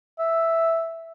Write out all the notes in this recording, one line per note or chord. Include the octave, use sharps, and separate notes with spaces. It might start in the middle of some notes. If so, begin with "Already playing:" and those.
E5